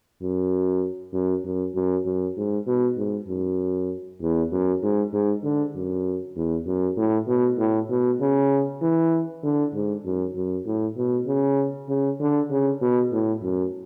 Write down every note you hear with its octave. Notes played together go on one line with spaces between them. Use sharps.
F#2
F#2
F#2
F#2
F#2
G#2
B2
G#2
F#2
E2
F#2
G#2
G#2
D3
F#2
E2
F#2
A2
B2
A2
B2
C#3
E3
D3
G#2
F#2
F#2
A2
B2
C#3
C#3
D3
C#3
B2
A2
F#2